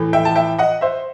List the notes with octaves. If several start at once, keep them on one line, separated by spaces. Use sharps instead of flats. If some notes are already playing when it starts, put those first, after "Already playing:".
Already playing: A2 E3
E5 G5
A5
E5 G5
D#5 F#5
C5 E5